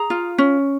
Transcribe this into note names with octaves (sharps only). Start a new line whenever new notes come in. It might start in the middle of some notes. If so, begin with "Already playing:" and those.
Already playing: G#4 A#5
F4
C#4